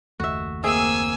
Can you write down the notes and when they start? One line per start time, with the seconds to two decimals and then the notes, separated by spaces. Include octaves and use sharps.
0.20 F#1 D#2 A3 F#4 E5
0.64 A#3 C4 G#4 E5 G#5 E6